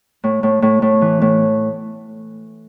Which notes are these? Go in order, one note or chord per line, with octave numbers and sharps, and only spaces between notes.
A2
A2
A2
A2
E3
A2